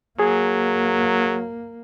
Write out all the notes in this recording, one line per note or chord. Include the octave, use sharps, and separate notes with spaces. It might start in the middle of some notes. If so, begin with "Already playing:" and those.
F#3 A#3 G#4